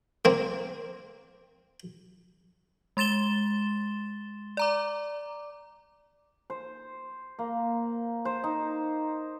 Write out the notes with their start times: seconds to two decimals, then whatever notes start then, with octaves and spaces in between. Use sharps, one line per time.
0.25 A#3 C4
2.97 G#3 C6 A6 E7 G7
4.57 D5 A#5 D6
6.50 C5
7.39 A#3
8.25 C5
8.44 D#4